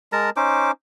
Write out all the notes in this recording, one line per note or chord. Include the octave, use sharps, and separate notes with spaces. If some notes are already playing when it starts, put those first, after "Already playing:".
G#3 A#4 A5 A#5
C#4 D#4 C5 D6